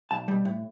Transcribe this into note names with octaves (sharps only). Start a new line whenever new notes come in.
B1 A5
B2 G3
A2